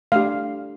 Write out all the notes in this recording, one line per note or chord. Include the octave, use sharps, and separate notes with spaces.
A3 D4 G4 F5